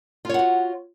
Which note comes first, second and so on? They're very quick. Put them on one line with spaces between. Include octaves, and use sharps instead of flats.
F4 C#5 F#5 F#4